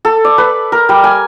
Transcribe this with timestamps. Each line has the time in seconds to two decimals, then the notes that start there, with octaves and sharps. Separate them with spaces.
0.05 A4
0.25 D5
0.38 B4
0.72 A#4
0.89 G3
1.04 G#5